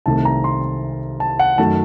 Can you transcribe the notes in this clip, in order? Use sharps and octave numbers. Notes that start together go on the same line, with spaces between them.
C2 C3 D#3 A3 A5
A#5
C6
A5
F#5
F#2 D#3 F#3 A3 A5